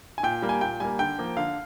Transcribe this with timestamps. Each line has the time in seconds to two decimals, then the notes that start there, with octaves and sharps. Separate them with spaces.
0.18 G#5
0.23 A#2 G5
0.42 G3 A#3
0.49 G#5
0.61 A#2 G5
0.80 G3 A#3 G#5
0.99 D3 G5
1.19 F3 A#3
1.37 D3 F5